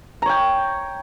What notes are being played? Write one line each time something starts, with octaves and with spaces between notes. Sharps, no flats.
C#5 G5 A#5